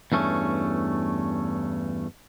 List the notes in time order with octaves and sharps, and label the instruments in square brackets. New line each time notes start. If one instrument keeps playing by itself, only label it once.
[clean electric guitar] E2 G2 A3 C#4